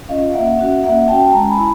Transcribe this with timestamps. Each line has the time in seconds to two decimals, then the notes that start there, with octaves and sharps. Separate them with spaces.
0.09 C#4 F4 D#5 F5
0.34 A#3 E5 F#5
0.59 C#4 F#4
0.83 A#3 E5 F#5
1.08 C#4 F#4 G5 A5
1.25 A5
1.33 G#3 G#5 A#5
1.49 A5 B5
1.57 E4